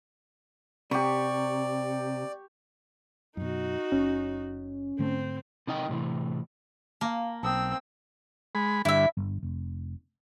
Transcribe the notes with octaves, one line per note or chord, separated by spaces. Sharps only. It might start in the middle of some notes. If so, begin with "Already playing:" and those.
C3 G4 D5 C#6
F#2 B2 D#4 F#4
F#1 C#4
G#2 D3 A3 C4
C3 D#4 D#5 G5
A2 C3 D#3 E3
A#3 F5 A5
B1 C4 A5 D#6 E6
G#3 B5
G2 D3 E4 E5
G1
F1